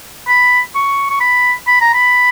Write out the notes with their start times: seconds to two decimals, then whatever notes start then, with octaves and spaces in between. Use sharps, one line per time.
0.28 B5
0.75 C#6
1.10 C#6
1.20 B5
1.67 B5
1.81 A#5
1.94 B5